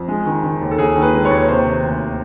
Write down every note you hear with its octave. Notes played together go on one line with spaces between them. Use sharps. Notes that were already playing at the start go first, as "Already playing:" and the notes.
Already playing: F2
G#3
D#3
D#3
D#2
A4
D#2 G#4
D#3
B4
G#3
C#5
D#2
C3 C5
D#3
D2